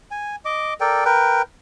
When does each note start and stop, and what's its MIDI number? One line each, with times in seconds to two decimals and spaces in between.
0.11 0.36 80
0.45 0.74 75
0.45 0.74 86
0.81 1.04 69
0.81 1.04 70
0.81 1.04 74
0.81 1.04 79
1.05 1.42 70
1.05 1.42 71
1.05 1.42 79